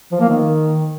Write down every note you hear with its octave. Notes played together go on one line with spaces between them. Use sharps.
F3
A#3
D#3